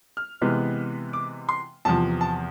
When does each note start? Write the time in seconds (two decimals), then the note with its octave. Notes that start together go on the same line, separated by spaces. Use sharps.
0.17 F6
0.42 C3 E3 G#3 B3
1.13 D6
1.49 C6
1.85 E2 C3 F3 A5
2.21 A5